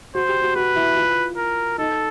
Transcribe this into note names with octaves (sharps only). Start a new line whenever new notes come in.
F#4 C5
G4
F#4
F#4 B4
E4
F4
A#4
D#4 A4